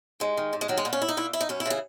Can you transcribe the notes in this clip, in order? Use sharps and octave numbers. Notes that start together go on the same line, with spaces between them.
G#2 G#3
D#3
G#2
G#3
D#3 F#3
G#3
A#2 B3
C#4
E4
D#4
A#2 E4
E4
D#4
F#2 C#4
E4
C#3 E3 G#4